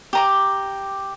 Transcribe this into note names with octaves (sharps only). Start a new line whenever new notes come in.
G4 A#5 D6